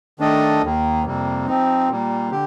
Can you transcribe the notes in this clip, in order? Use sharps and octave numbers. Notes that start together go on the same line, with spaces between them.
D#3 A3 D4 A4 D#5
D#2 D#3 A#3
F2 C3 G3 A#3
F3 C4 D#4
A#2 G3 A#3
D3 G4